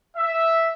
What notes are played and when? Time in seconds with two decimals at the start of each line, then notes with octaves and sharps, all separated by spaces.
0.17 E5